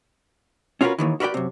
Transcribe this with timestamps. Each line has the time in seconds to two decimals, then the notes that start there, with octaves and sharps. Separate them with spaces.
0.81 C#4 F4 F#4 G#4 A#4 B4
0.99 D#2 D#3 E3
1.20 F#4 A#4 B4 D5 G5
1.34 F#2 C3